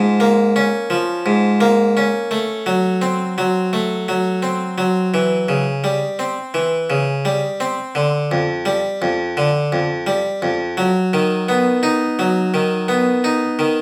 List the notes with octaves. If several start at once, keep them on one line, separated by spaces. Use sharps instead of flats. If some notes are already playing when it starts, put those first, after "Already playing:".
Already playing: G#2 F3
A#3
C#4
F3
G#2
A#3
C#4
A3
F#3
C4
F#3
A3
F#3
C4
F#3
E3
C#3
G3
C4
E3
C#3
G3
C4
D3
F2
G3
F2
D3
F2
G3
F2
F#3
D#3
B3
D#4
F#3
D#3
B3
D#4
D#3